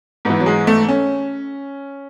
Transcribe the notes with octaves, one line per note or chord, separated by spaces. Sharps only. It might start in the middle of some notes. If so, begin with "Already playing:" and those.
G#2 E3 B3
F#3
G#3
A3
C#4